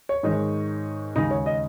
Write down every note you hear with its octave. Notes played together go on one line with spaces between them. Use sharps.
C#5
G#2 D#3 G#3 D#4
D#2 C#3 G#3 D#4
C#5
D#5